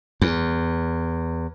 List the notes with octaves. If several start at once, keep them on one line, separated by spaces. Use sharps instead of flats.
E2